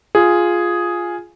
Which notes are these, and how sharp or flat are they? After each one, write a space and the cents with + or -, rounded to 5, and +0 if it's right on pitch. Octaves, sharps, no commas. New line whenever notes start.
F4 +0 G#4 +0